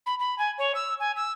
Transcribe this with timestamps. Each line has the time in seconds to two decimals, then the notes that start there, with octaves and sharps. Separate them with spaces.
0.06 B5
0.19 B5
0.38 G#5
0.58 C#5
0.75 E6
0.99 G#5
1.16 E6